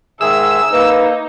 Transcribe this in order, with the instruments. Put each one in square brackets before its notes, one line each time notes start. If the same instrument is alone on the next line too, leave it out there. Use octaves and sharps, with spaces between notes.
[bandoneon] G#2 D#3 G#4 [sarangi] E5 [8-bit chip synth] E6
[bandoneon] A#3 [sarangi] D#4 [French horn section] B4